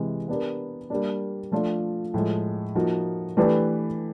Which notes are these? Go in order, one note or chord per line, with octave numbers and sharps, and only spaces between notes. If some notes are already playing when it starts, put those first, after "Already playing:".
Already playing: C3 E3 G#3
B3 D4 G4 A#4
G3 A#3 D4
F3 A3 D4 F4
A2 F3 G#3
F3 A#3 D#4 F#4
E3 A3 D4 G4 B4